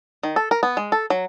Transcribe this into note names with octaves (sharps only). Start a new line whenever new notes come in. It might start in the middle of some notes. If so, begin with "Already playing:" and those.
D#3
A4
A#4
B3
G#3
A4
F#3